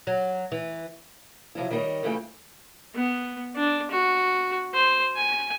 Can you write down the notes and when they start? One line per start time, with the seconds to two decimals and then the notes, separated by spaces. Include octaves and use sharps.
0.07 F#3
0.52 E3
1.55 C3 F3 F#3 E4
1.71 D#3 G3 D#4 E4 A#4 C#5
2.03 F2 C#3 E3 G3 A3 G5
2.95 B3
3.56 D4
3.91 F#4
4.74 C5
5.16 G#5